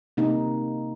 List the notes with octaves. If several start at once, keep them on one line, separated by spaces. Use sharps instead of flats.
C3 A#3 D#4